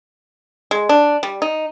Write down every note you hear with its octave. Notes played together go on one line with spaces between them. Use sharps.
G#3
D4
G3
D#4